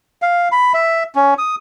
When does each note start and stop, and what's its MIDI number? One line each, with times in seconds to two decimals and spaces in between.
0.22 0.49 77
0.52 0.73 83
0.74 1.04 76
1.15 1.34 61
1.38 1.56 87